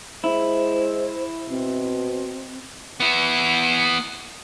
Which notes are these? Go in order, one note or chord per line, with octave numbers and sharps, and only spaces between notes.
G#3 E4 C5
B2 C4
B3 E4